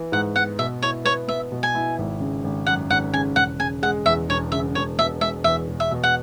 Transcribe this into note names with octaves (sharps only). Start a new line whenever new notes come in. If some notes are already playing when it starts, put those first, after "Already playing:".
Already playing: E3 B3
G#2 F#5
B3 F#5
B2 E5
E4 C#5
B4 C#5
B3 E5
B2
G#5
E4
G#1
C#3
G#1
F#2 F#5
G#1 F#5
C#3 G#5
E1 F#5
C#3 G#5
G#3 F#5
E2 E5
E1 C#5
C#3 E5
E1 C#5
B2 E5
G#3 E5
E2 E5
E1
E5
B2
F#5